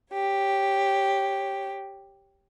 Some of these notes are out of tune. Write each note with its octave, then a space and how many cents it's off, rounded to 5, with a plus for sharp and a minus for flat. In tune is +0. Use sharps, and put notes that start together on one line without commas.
G4 +0 C#5 -10